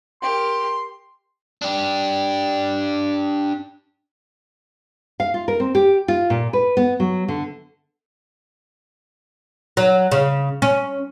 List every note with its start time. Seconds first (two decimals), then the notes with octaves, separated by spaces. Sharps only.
0.22 G4 A#4 C6
1.62 D4 G4
5.20 F5
5.34 F4
5.48 A#4
5.60 C4
5.75 G4
6.08 F4
6.30 A#2
6.53 B4
6.77 B3
7.00 F#3
7.28 D3
9.77 F#3
10.12 C#3
10.62 C#4